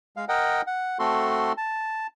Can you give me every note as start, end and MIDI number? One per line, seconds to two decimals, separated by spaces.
0.16 0.25 56
0.16 0.25 77
0.29 0.62 70
0.29 0.62 75
0.29 0.62 78
0.29 0.62 79
0.67 0.98 78
0.99 1.52 57
0.99 1.52 60
0.99 1.52 66
0.99 1.52 69
0.99 1.52 84
1.57 2.07 81